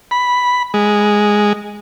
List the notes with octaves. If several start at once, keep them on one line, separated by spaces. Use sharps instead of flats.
B5
G#3